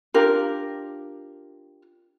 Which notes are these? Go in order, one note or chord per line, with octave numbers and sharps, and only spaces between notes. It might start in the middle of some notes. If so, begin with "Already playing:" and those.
D4 F4 G4 A#4